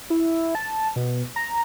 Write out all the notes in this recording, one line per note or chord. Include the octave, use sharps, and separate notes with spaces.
E4
A5
B2
A#5